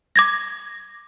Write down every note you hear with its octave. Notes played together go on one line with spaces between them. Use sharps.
D6 G#6 A#6